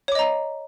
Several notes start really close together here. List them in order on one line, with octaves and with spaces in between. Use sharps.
C#5 D6 D#5 A#5